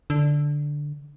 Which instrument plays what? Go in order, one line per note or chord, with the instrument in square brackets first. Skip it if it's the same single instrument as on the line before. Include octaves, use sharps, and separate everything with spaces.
[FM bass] D3